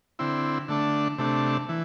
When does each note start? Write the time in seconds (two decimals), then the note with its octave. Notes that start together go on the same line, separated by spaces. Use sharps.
0.19 D3 C4 E4
0.68 D3 A3 D4
1.18 C3 A3 D4
1.69 E3